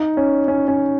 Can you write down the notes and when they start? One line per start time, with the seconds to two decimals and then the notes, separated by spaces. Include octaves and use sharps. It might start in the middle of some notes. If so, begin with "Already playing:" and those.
Already playing: D#4
0.17 C#4
0.48 C#4
0.68 C#4